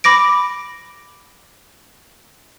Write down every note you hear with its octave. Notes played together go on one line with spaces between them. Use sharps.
B5 D6 A#6 D7